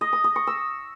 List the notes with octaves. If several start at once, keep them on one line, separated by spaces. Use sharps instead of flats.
D#5
D#6
D#5
C#6
E6